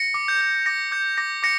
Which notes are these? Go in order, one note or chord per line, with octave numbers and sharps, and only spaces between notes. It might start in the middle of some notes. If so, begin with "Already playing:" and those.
Already playing: A#6 C#7
D6
G6
G6
D6 A#6
D6 G6
D6 A#6
D6 A#6 C#7